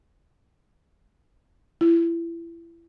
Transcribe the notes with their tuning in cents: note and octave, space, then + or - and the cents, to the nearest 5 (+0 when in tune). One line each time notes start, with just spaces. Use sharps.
E4 +30